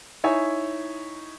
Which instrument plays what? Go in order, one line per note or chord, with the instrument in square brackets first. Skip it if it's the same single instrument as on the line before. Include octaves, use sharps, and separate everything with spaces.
[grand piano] D#4 E4 C#5 E5 G#5